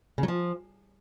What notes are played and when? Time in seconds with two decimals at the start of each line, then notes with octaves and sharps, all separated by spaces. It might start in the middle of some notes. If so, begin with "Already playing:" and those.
0.18 C#3
0.23 F#3
0.28 F3